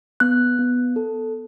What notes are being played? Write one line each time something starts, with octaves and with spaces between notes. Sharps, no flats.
B3 F#6
B3
A4